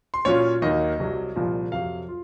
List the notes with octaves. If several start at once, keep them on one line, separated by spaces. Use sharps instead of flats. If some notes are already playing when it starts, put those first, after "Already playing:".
C6
A#2 F#3 C#4 F4 C#5
D#2 D#3 F#3 A#3 D#5
C2 C3 F#3
C2 A#2 F3
F2 C3 F#3 F5
F4